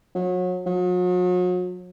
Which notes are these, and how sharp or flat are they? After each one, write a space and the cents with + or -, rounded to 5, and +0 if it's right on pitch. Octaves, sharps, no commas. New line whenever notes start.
F#3 -30
F#3 -40